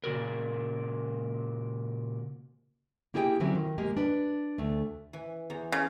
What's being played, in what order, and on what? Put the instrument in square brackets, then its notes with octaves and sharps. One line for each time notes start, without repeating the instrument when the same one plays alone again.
[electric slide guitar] A#2 C#3 F#4 A#4
[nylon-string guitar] A#3 E4 G4 G#4 D5 G5
D3 E3 F#3 C4 C#4 E4
D#3
G#3 A#3 G4
D4 B4
D2 A3
[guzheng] E3
E2 A#5
[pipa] C#3